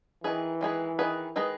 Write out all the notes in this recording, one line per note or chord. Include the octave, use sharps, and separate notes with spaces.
D#3 E3 G#3 D#4 G#4 B4
D#3 G#3 D#4 G#4 B4
D#3 G#3 D#4 G#4 B4
D#3 G#3 D#4 G#4 B4